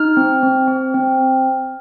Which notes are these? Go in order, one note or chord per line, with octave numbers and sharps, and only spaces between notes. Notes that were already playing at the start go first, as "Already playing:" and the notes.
Already playing: D#4 F6
C4
C4
C4
C4